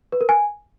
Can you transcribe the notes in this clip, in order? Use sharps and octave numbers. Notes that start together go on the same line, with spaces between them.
B4
A#4
G#5